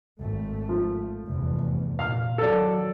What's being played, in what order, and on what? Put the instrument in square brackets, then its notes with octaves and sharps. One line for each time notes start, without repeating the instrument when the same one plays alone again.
[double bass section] G#1 A3
[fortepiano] F3
[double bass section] F1 E2 G2
[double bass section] A#2 [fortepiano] F5 F6
[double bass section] D#3 F#3 [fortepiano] A4 D5